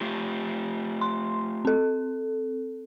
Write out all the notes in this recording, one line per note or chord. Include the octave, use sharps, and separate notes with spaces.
A3 F4 G4
C6
C4 A4